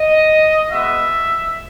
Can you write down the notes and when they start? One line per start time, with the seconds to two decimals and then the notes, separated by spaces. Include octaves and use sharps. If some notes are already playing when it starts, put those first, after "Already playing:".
Already playing: D#5
0.71 G#3 B3 F#4 E5